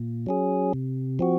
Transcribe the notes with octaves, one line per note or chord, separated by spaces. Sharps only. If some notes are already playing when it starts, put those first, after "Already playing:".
Already playing: A#2
F#3 C#4 G#4
C3
F3 C4 F#4